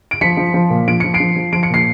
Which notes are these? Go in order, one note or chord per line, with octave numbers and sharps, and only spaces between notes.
D7
F3 B6 C#7
F3
F3
A#2
F3 D7
F3 C#7
C7 D7
F3
F3
F3 D7
C#7
A#2 C7